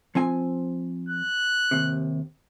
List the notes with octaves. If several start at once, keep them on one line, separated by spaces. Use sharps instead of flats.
F3 C4 G#5
F#6
D#2 C3